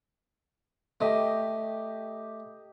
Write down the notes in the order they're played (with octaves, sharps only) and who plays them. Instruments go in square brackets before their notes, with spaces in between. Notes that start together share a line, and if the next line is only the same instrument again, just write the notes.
[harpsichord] A3 [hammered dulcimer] G4 D#5 D6